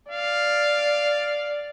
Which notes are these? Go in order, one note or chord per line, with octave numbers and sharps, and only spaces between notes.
D5 F5